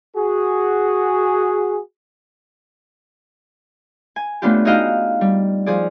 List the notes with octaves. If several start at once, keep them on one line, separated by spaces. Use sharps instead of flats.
F#4 G#4
G#5
A3 B3 C#4 D4 F4 G4
D#4 F#4 G#4 D#5 F5 G5
G3
F3 G#4 D5